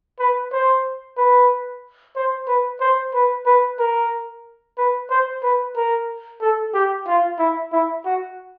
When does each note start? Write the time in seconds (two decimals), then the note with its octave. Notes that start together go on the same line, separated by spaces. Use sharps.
0.19 B4
0.52 C5
1.17 B4
2.16 C5
2.47 B4
2.81 C5
3.14 B4
3.46 B4
3.79 A#4
4.78 B4
5.10 C5
5.43 B4
5.76 A#4
6.41 A4
6.74 G4
7.07 F4
7.38 E4
7.72 E4
8.05 F#4